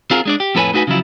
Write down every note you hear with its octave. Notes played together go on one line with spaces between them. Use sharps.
C4 F4 F#4 G#4 A#4
G#3 D4 D5
G4
F2 A2 A4 B4 C#5 G#5
A3 D#4 F#4 B4 G#5
C#3 F3 F#3 E4 F4